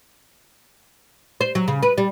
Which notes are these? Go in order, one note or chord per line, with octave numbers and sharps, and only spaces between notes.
C5
F#3
C#3
B4
G3